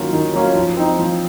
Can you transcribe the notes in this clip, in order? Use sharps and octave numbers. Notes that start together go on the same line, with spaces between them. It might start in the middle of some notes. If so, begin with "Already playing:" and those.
Already playing: D#3 F#3 A#3 C#4 F4
D#3
F#3 A#3 C#4 F4
F3
C4 D#4
F3